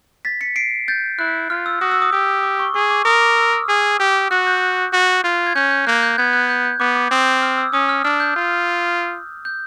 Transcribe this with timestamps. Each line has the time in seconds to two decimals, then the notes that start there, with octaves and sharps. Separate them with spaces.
0.25 A6 B6
0.41 B6 C#7
0.56 C7 D7
0.88 G6 A6
1.19 E4 F#6
1.50 F4 F6
1.66 E6
1.81 F#4 D#6
1.92 E6
2.02 D#6
2.12 G4 D#6
2.43 D6
2.60 C#6
2.74 G#4 C#6
2.90 D6
3.05 A#4 D#6
3.22 D6
3.37 E6
3.53 F6
3.69 G#4
4.00 G4
4.31 F#4 F#6
4.47 G6
4.93 F#4
5.24 F4
5.47 G#6
5.55 C#4 G6
5.71 G6
5.87 A#3 F#6
6.02 G6
6.18 B3 F#6 G#6
6.33 F#6 G#6
6.49 G6
6.64 G6
6.80 B3 D6
6.96 D6
7.11 C4 D#6
7.42 F6
7.58 E6
7.73 C#4 D#6
7.89 F6
8.04 D4 F6
8.20 G6
8.36 F4
9.45 G6